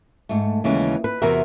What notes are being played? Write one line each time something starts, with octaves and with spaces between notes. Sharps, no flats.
G#2 A3
D#2 C#3 E3 G#3
B4
E2 C3 E3 F#4 A#4 E5